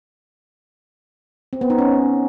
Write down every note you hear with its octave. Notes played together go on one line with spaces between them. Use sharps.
C4
B3
D#4
C#4